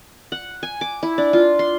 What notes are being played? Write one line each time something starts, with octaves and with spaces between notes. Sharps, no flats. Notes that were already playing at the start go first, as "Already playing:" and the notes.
F#5
G#5
D6
E4
D4
F4
C6